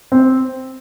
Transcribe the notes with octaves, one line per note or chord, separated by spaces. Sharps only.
C4